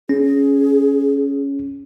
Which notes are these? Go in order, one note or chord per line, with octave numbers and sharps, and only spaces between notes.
C#4 G#4